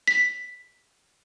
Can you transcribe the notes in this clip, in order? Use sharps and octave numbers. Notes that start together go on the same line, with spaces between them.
B6